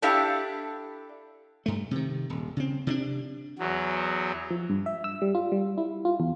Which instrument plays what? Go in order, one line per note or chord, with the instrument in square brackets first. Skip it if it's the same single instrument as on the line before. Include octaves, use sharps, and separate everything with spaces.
[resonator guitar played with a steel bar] D4 E4 G4 A4 E5 F5
[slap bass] G2 A3
C3 D#3
D#1
C#3 C4
C3 C#4 D4
[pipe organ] E2 F#3
[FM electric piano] F3
G2
E5
E6
G3
F4
G3
E4
F4
E2